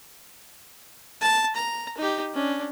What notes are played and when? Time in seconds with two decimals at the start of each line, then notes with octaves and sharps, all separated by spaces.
1.21 A5
1.55 A#5
1.97 D#4 G4
2.34 C#4 D4